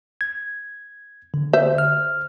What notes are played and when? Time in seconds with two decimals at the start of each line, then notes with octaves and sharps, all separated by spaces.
0.21 G#6
1.34 D3
1.53 C5 E5
1.78 F6